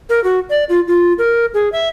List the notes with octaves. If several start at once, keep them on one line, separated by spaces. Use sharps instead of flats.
A#4
F#4
D5
F4
F4
A#4
G#4
E5